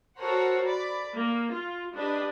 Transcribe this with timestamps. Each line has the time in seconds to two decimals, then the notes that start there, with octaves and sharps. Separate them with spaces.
0.19 F#4 A4 A#4 C5 C#5 F#5
0.65 D5 B5
1.14 A#3
1.52 F4
1.94 D4 G4 B4 D#5